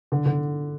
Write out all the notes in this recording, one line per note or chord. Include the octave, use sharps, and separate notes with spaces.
D3
D3